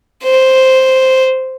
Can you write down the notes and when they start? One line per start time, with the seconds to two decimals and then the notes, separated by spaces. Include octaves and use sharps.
0.24 C5